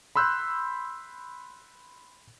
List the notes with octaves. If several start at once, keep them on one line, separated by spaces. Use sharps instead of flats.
B5 C6 E6 F#6 G6